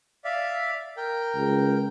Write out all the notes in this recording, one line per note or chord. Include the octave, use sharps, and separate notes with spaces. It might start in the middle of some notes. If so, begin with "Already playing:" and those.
D5 E5 F5
A#4 G5
C#2